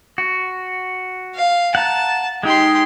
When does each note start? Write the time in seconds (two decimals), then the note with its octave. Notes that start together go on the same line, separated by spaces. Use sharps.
0.18 F#4
1.36 F5
1.75 F#5 A5 A#5
2.43 G#3 D#4 G4 C6